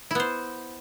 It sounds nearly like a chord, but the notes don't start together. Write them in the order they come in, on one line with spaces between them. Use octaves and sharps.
E4 B3 C5